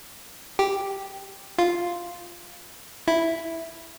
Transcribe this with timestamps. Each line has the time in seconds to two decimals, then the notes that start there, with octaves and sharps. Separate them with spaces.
0.59 G4
1.58 F4
3.08 E4